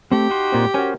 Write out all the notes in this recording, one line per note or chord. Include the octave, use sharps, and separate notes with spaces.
A3 C4 G4
D#4 F#4 C6
A#2 C4
C#4 F#4 A#4 C5 G#5